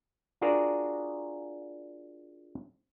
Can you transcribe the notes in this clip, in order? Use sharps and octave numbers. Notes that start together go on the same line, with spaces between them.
D4 F4 F#4 G#4 A#4 D5